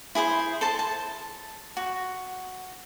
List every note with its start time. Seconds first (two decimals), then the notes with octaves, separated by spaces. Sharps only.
0.15 E4 G#4 B4 C5
0.61 A4 C5 A5
0.79 A5
1.77 F#4